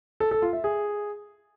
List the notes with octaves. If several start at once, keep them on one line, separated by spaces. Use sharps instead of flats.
A4
A4
F4
E5
G#4